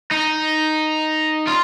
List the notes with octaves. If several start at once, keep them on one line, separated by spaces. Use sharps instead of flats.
D#4
F4